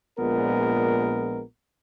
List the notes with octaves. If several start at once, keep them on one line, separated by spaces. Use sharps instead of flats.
A#1 A#2 G#3 B3 A#4